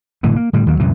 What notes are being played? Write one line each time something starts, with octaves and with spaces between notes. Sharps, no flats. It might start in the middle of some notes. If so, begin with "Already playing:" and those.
F1 A2 D3 E3
A#3
A2 D3 G3
D#2 D#3 F#3 A#3
C2 F#2 A#2 E3